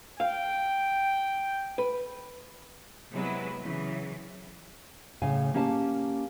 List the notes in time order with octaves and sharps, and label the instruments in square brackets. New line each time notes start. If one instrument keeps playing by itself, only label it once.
[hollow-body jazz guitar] F5 [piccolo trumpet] G5
[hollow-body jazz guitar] B4
[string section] C3 F#3 G#3 B3 E4 B4
C#3 E3 F#3
[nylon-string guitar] A2 C#3 F5 G#5
A#3 C#4 G4 F5 F#5 A5